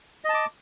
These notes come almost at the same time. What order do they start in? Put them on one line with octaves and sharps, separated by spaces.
D#5 A5 D6